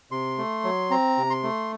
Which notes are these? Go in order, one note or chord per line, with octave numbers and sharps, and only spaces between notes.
C3 C6
A3
F#3
C4 A#5
C3
C6
A3